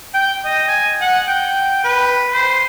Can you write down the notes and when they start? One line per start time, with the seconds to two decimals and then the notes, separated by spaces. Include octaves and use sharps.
0.14 G5
0.45 D#5
0.68 G#5
1.01 F#5
1.27 G5
1.84 B4
2.32 C5